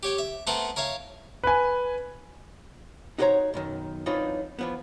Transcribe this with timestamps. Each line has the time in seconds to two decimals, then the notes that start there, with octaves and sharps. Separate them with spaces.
0.03 G4 C#5 G5
0.18 E5
0.47 A3 B3 C4 A4 A#4
0.76 A#4 C#5 E5 F5
1.44 B4 G#5
3.18 D#4 F#4 G4 C5 C#5 A#5
3.54 B1 F#2 D#3
4.06 E3 F#3 C4 D4 D#4 F4
4.59 E3 F3 B3